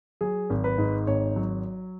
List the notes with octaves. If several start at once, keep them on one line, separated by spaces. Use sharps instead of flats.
F#3 G#4
G#1
B4
G#2
G#1 C#5
F#3